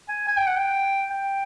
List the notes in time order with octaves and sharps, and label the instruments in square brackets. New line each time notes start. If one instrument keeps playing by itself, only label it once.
[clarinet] G#5
G#5
G5
F#5
G5
G5